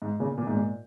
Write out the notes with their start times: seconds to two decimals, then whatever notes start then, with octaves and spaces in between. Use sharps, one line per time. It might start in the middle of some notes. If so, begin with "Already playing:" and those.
0.02 G#2
0.20 A#2 C#3
0.38 A#2
0.47 G#2
0.56 A#2